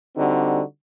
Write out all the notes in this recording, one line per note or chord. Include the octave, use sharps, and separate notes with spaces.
D3 G3 C4 D#4 F#4